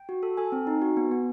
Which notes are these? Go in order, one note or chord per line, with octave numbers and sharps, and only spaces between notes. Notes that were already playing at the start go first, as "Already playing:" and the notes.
Already playing: G5
F#4
A4
A4 G#5
C4
D#4
F#4
B3
B3